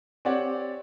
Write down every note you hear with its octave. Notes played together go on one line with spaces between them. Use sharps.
C4 G4 C#5 D5 F#5